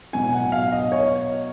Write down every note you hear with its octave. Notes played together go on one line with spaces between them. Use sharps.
B2 F#3 G#5
F#5
F5
D#5
C#5